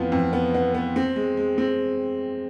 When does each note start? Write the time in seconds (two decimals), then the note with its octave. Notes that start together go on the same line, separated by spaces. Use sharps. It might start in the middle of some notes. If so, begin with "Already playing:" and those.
Already playing: F2 E3 B3 F4
0.12 F2
0.33 B3
0.54 B3
0.74 B3
0.96 C4
1.16 G#3
1.37 G#3
1.58 C4